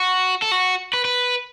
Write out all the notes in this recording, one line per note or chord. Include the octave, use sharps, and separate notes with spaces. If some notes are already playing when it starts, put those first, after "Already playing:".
Already playing: F#4
A4
F#4
B4
B4